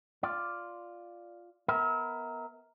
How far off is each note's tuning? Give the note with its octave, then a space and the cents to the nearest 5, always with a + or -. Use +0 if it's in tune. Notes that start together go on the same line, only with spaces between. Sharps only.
F4 +0 D5 +0
B3 +0 A#4 +0 E5 -35